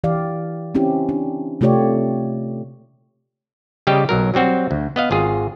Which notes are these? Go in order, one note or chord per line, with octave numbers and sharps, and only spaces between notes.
E3 G4 D5 F5
C4 C#4 E4 G4
D4
C3 A3 F4 G4 C#5 D5
C#3 G3 G4 D#5 G5
B1 F#3 A#4
F#3 G3 C4 F#4
D2
B3 D#5 F5
G#1 F4 G#4